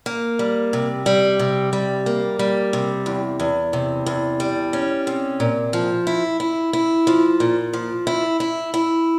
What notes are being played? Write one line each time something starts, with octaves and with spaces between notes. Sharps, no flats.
A#3
G3
C3
G3
C3
G3
A#3
G3
C3
E2
E2
C3
E2
G3
C#4
C3
A#2
F3
E4
E4
E4
F3
A#2
F3
E4
E4
E4